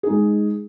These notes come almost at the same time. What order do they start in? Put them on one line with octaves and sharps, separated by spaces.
G#4 D#4 G#3